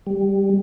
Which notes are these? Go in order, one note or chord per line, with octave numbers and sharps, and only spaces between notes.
G3